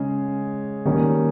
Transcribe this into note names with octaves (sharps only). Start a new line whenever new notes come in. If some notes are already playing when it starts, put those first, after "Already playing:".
Already playing: C#3 G#3 C#4
D#3 G3 A#3 C#4